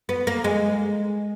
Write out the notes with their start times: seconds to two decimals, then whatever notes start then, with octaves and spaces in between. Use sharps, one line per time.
0.09 B3
0.27 A#3
0.44 G#3